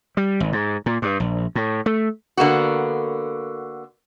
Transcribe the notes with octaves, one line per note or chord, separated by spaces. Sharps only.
G3
G#1
G#2
A#2
G2
A#1
A2
A3
D3 A#3 B3 F#4